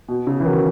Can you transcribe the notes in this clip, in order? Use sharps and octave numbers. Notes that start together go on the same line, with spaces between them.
B2
C#3
E3
D#3 F#3